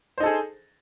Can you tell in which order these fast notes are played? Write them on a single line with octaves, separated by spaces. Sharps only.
C5 D#4 A4 G#4